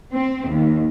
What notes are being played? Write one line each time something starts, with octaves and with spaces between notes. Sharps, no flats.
C4
D#2